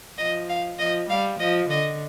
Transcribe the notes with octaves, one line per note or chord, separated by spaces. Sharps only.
F3 D#5
F5
F3 D#5
G3 F5
F3 D#5
D3 D#5